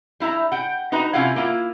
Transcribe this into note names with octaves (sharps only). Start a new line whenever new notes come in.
G3 E4 E5 A#5
F#5 G5
D#4 F#4 B4 D#5 A#5
C3 C#4 E4 F4 F5 F#5
A#3 E4 F4